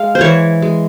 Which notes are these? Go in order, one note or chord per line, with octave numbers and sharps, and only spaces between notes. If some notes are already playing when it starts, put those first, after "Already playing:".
Already playing: G#3 F5
C5
E3 C#5
G#3